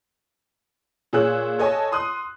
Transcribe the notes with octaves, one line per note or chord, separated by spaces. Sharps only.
A#2 G#4 C#5 E6 F#6
A4 C#5 D#5 G#5 A5
C6 D#6 F#6